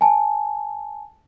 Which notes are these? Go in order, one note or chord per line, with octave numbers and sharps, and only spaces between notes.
G#5 A5